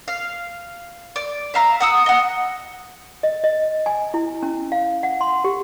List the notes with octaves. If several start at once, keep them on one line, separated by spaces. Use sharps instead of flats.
F5
D5
E5 F5 A#5
F#5 D#6 E6
D#5 F#5
D#5
D#5
G#5
E4
C#4
F5
F#5
C6
G4